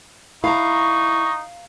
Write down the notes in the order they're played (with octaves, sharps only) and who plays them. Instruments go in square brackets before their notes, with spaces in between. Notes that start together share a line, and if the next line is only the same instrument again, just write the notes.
[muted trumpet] D#4 [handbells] E4 [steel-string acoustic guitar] F5 A#5 [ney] C#6